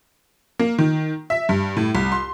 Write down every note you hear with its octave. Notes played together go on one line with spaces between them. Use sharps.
A#3
D#3
E5
G2
A2
C2
C6